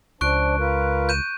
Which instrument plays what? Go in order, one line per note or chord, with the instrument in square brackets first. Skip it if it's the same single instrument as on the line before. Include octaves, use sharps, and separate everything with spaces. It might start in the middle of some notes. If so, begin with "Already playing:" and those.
[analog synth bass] C#2 [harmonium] F3 D4 [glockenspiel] C#6 F#6 D7
[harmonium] F4 A#4 B4
[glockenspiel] G6 D#7 E7